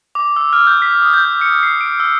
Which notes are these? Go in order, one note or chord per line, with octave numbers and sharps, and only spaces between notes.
D6
E6
F6
G6
B6
D#6
G6
C#7
C7
D7
E6